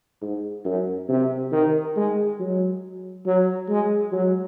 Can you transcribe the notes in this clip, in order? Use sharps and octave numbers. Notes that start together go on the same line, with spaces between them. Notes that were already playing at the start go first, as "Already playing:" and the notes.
G#2
F#2
C3
D#3
G#3
F#3
F#3
G#3
F#3